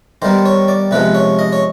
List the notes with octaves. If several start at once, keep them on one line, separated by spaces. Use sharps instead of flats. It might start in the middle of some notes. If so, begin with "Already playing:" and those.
D#3 G3 B3 C5
C#5
D5
C3 F3 G#3 B3 B4
C#5
D#5
C#5